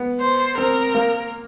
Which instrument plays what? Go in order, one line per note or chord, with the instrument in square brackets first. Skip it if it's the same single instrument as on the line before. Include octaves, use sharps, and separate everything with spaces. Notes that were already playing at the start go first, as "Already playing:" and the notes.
Already playing: [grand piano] B3
[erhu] C5
[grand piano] C4 [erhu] A#4
[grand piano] A#3